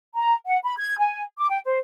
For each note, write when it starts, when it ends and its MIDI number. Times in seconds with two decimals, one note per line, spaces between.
0.15 0.35 82
0.46 0.58 78
0.65 0.75 83
0.78 0.98 92
0.98 1.23 80
1.38 1.49 86
1.50 1.59 79
1.65 1.79 72